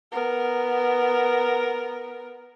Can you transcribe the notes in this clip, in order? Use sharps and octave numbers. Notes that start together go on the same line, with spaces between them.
B3 A#4